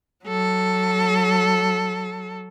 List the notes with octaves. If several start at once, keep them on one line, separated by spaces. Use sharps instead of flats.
F#3 A4